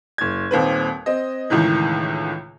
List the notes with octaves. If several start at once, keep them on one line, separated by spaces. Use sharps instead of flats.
F#1 G#6
D#1 D#2 C4 B4
C4 D#5
C#2 A2 D#3 E3